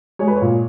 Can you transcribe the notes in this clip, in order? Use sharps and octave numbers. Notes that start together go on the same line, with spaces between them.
G#3 C#5
B4
C#5
A#2